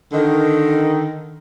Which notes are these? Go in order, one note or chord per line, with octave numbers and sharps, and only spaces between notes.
D3 D#3